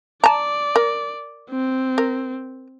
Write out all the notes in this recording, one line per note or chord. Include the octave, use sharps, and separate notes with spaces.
D5 A5 A#5
A#4
C4
A#4